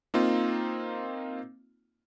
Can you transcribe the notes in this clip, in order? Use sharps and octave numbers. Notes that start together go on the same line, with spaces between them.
A#3 C4 D#4 F4